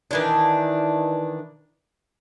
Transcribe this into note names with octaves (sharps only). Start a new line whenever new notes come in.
D#3 E3 D4